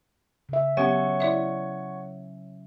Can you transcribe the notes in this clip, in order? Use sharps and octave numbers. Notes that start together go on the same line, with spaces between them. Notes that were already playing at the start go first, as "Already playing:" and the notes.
C#3 E5
F#3 B3 C#4 G4 C#5 F#5 G#5 C#6
E4 D5 E5